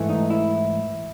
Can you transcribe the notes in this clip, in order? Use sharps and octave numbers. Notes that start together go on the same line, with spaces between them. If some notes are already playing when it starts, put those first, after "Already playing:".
Already playing: G#2 E3 A3
D#4
E4